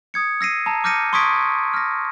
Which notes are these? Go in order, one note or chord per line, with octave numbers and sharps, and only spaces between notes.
D#6 G#6 C#7
E6 A#6 C7 D#7
A5 A#5
D6 F6 G6 A#6 C#7 D#7
C6 C#6 D#6 G#6 B6 D7
F6 A#6